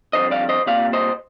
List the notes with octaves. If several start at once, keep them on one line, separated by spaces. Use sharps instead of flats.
F2 D3 G3 C5 D#5
D5 F5
C5 D#5
C2 A#2 G3 D5 F5
C5 D#5